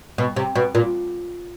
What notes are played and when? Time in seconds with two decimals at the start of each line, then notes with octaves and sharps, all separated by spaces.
0.18 B2
0.36 C3
0.56 B2
0.75 A#2